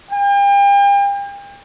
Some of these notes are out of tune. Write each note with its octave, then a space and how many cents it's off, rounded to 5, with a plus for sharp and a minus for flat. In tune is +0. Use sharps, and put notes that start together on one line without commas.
G5 +40